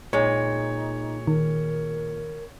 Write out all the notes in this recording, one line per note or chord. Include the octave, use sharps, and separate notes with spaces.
A#2 G#3 D#4 C#5
D#3 A#4